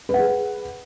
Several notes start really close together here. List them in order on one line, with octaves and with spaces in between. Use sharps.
B4 F#5 G#4